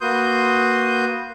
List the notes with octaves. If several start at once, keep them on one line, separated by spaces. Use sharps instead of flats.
A#3 F#4 B4 C6 D#6 G6